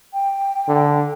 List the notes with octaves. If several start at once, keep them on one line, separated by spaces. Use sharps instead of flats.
G5
D3